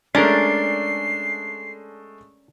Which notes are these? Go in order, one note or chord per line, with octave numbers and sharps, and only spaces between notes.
G#3 A3 C#4 D4 A#4 C7